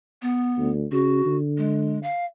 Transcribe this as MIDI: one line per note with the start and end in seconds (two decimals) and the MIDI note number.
0.22 0.70 59
0.58 0.85 38
0.92 1.26 49
0.92 1.37 66
1.26 2.08 50
1.58 1.99 56
2.03 2.25 77